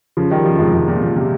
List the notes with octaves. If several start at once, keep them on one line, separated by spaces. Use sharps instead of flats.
C#3 F3
D#3 G3
C#3 F3
G#2 C3
G#2
A#2
A#2
C3